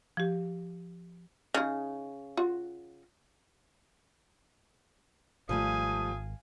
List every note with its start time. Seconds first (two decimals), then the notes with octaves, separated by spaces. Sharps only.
0.17 F3 G4
1.54 C#3 D#4 G#4
2.37 F4 F#4
5.49 G#1 F3 G3 A3 F5 G#5 D#6